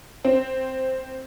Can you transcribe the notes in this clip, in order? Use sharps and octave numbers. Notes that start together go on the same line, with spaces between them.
C4